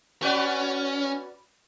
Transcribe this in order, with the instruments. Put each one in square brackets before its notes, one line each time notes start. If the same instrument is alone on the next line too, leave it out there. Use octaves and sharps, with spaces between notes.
[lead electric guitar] C#4 [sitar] F#4 B4 D5